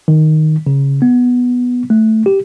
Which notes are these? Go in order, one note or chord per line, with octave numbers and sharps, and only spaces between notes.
D#3
C#3
B3
A3
G4